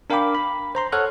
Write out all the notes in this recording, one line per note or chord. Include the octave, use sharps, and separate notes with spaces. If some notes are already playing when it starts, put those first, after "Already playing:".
D4 A#4 F5 G5 B5 D6
B5
C5 A#5 C6
A4 C#5 F#5 F6 F#6